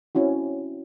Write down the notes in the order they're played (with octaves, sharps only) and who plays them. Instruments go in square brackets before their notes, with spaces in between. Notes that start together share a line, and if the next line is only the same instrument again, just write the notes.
[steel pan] C4 C#4 E4 F#4